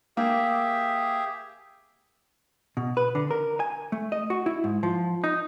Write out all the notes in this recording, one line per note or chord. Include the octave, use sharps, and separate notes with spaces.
A#3 G4 G#4 E5
B2
B4
D3
A#4
G#5
A3
D#5
F#4
E4
G#2
F3
D#4